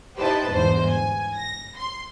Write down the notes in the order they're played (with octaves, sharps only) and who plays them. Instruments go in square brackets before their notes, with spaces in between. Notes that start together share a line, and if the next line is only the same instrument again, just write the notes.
[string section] D#4 E4 G4 B4 C5 A5
G1 E2 G#2 C5
G#5
A#6
C6